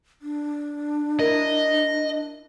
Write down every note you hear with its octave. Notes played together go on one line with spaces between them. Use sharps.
D4
E4 A#4 D#5